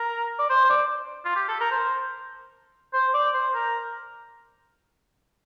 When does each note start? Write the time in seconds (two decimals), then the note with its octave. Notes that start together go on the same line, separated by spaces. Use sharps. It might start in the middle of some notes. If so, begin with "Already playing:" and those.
Already playing: A#4
0.39 D5
0.50 C5
0.65 C5
0.70 D5
1.25 F4
1.36 G4
1.49 A4
1.61 A#4
1.71 C5
2.93 C5
3.14 D5
3.34 C5
3.54 A#4